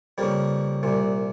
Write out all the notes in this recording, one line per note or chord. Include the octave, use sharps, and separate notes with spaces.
F2 C#3 G3 A#3
C2 A#2